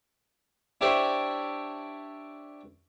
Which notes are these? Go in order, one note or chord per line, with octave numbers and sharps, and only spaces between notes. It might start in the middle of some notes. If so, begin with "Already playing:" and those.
D4 E4 G4 C5 C#5